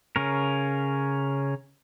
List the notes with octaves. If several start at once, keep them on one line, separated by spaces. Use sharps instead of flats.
C#3 C#4 A#4